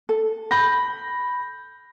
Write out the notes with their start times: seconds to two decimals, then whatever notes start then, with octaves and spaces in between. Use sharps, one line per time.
0.09 A4
0.51 B5 G6 A#6